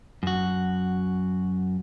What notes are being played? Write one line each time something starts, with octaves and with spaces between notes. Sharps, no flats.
F#2 F#4